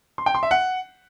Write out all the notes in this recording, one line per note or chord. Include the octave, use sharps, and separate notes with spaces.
C6
G5
C6
E5
F#5